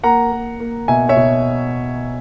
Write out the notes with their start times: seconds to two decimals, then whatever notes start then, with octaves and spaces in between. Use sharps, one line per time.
0.03 A#3 F#5 A#5
0.32 A#3
0.60 A#3
0.88 B2 E5 G#5
1.09 C#5 E5
1.17 B2